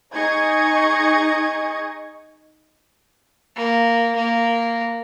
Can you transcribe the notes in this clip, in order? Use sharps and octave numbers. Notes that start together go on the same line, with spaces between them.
D#4 G#4 D#5 C#6 G#6
A#3
A#3